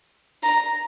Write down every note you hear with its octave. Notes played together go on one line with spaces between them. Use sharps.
A#5